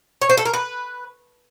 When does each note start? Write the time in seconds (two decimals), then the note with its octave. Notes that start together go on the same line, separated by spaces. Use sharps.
0.22 C#5
0.30 C5
0.37 A4
0.45 A#4
0.53 B4